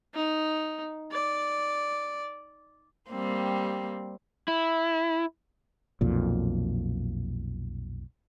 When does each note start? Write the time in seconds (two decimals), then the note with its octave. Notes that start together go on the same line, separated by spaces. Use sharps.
0.14 D#4
1.11 D5
3.09 G3 A#3 C4
4.48 E4
6.01 B1 F2 A#2